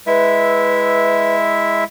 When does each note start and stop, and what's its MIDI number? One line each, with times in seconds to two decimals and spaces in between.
0.07 1.84 56
0.07 1.84 64
0.07 1.35 71
0.07 1.84 76